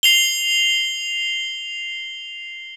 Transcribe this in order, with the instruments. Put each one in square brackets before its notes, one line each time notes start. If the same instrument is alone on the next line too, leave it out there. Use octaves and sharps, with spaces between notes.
[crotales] C7 F7 G7